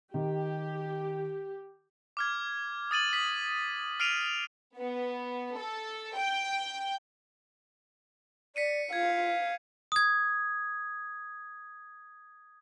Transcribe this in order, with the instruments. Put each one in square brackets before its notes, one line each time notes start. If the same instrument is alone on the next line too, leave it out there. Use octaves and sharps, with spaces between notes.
[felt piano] D#3 [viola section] G4
[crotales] D6 F6 G#6
D#6 A6 D#7 F#7
B6 F#7
F6 C7 D7 D#7 F7
[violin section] B3
A4
G5
[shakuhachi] D5 [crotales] B6 C#7 D#7
[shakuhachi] F4 [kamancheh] F5 [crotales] G#6
[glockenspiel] D#6 G#6